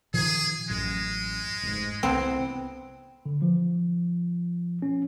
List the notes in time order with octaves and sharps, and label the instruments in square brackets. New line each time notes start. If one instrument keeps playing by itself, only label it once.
[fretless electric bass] A#2 D#3 F3 [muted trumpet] G#4
[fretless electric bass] A1 F#2 [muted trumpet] G#3
[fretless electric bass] F1 G#2
[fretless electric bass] C2 [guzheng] B3 C4
[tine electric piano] D3
F3
C#4